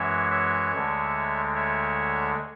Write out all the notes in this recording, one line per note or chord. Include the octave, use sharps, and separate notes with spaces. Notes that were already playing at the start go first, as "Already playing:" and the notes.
Already playing: F#2 E3 G#3 C#5 E5
C#5 E5
D2 D3 G#3
C#5 E5